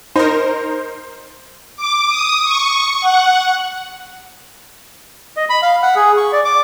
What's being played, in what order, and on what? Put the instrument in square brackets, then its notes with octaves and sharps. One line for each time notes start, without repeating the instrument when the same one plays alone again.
[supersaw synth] D#4 A#4 [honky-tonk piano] C5
[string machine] D6
D#6
C#6
F#5
[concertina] D#5
B5
F5
F#5
G#4
C#6
D5
D6